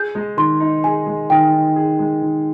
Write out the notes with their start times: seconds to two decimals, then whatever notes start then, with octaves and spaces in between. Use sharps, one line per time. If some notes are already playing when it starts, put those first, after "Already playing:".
Already playing: G#4 G6
0.15 G#3
0.37 D#3 C6
0.60 D#4
0.84 G#4 G#5
1.06 G#3
1.30 D#3 G5
1.52 D#4
1.76 G#4
1.99 G#3
2.22 D#3